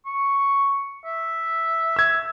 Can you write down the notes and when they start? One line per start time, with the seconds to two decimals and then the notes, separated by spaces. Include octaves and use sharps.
0.05 C#6
1.05 E5
1.96 E6 G#6